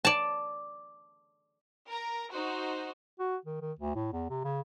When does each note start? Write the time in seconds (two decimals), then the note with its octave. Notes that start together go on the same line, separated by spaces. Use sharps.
0.05 D5 A5
1.89 A#4 A#5
2.32 D#4 F#4 C5
3.19 F#4
3.45 D#3
3.61 D#3
3.79 D2
3.95 A2
4.12 E2
4.30 C3
4.44 C#3